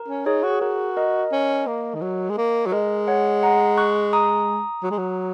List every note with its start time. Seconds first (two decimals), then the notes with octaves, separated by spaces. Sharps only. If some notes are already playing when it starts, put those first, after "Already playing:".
Already playing: A#4
0.08 C#4
0.26 D#4 G#4 C#5
0.43 F#4
0.50 G#4
0.61 F#4 A#4
0.97 A#4 D#5
1.32 C#4
1.67 A#3
1.95 D#3
2.01 F#3
2.29 G#3
2.37 A#3
2.66 F#3
2.72 G#3 A#4 D#5
3.08 C#5 F#5
3.43 F#5 A#5
3.78 C#6 F#6
4.13 A#5 D#6
4.83 F#3
4.91 G#3
4.98 F#3